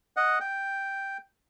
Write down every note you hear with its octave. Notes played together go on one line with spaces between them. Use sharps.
D#5 F#5
G5